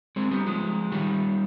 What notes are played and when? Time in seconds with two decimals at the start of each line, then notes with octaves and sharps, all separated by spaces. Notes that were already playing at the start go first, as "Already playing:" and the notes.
0.16 G#3 C4
0.31 G3 B3
0.46 F3 G#3
0.92 D#3 G3